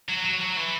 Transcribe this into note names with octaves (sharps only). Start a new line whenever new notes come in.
F#3
F#3
F#3
E3